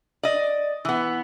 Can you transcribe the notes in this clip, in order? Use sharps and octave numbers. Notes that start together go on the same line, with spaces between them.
D5 D#5
E3 B3